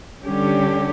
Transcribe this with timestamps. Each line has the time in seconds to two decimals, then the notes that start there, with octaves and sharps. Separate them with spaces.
0.25 D3 G3 C#4 G4